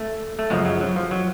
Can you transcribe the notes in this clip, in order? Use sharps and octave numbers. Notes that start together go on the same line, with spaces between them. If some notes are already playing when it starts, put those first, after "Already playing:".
Already playing: A3
A3
F#2 C#3 F3 G#3
F#3
F#3
F3
F#3